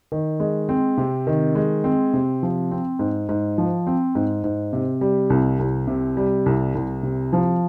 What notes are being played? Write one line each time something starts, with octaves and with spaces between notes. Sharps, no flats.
D#3
G#3
C4
C3
D#3
G#3
C4
C3
F3
C4
G#2
G#2
F3
C4
G#2
G#2
C3
G3
C2
C2
C3
G3
C2
C2
C3
F3